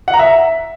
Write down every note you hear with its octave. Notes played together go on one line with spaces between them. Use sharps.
F#5
A#5
E5